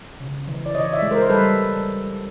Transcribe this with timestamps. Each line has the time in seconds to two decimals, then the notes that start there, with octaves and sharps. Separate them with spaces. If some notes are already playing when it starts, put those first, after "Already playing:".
0.20 C#3
0.48 E3
0.66 D5
0.75 E3 C#5 D#5
0.93 D5 E5
1.02 G#3
1.11 A#4 C5
1.22 C5
1.29 G3 A4 B4